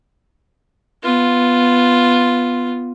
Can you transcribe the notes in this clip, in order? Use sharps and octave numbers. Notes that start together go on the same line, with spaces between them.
B3 F4